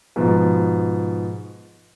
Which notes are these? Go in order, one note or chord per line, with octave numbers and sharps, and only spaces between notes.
G#2 B2 F3